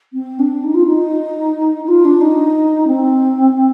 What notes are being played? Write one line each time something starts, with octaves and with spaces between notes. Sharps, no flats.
C4
D4
D#4
F4
D#4
D#4
F4
D4
D#4
C4